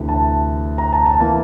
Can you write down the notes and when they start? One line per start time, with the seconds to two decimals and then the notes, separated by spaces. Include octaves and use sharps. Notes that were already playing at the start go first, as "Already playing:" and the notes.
Already playing: D2 C3 E3
0.09 A5
0.78 A#5
0.93 A5
1.06 A5
1.20 E3 A#3 A5